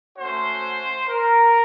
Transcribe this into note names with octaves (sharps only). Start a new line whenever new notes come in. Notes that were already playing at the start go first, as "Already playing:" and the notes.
A3 C#4 F#4 C5
A#4